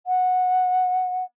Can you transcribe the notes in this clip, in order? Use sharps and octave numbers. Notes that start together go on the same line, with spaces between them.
F#5